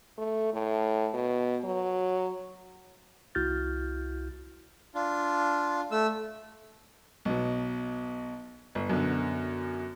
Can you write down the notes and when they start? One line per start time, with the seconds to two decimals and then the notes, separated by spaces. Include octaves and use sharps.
0.18 A3
0.54 A2
1.14 B2
1.64 F#3
3.35 C2 E4 F#4 F6 G6 A6
4.95 D4 F4
5.91 A3 E6
7.25 B1 B2
8.75 G1
8.89 F#2 B2 D3